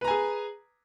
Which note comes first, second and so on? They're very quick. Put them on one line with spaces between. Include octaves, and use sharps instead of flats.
B4 A#5 G#5 G#4